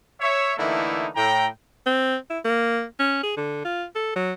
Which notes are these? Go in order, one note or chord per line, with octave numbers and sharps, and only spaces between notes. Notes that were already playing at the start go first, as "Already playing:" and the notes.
C#5 E5
D3 E3 A3 A#3 D#4 E4
A2 G5 A#5
C4
E4
A#3
C#4
G#4
D3
F4
A4
F#3